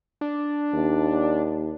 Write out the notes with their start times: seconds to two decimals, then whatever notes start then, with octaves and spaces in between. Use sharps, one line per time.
0.21 D4
0.73 D#2